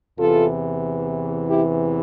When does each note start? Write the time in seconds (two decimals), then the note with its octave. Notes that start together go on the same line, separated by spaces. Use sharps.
0.19 E2 C3 E3 F4 A4
1.49 E4 G4